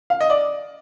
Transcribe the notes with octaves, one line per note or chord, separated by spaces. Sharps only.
F5
D#5
D5